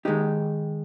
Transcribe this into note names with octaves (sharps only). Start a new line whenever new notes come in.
D#3 G#3 D#4 G4